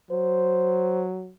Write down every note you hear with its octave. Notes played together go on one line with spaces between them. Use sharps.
F#3 C5